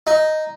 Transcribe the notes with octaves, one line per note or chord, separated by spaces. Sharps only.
D#4